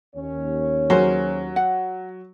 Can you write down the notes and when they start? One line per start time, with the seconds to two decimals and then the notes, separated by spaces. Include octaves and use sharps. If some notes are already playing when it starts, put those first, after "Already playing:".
0.15 D#2 C#4 C#5
0.90 F#3 G#4 A#4 C5
1.56 F#5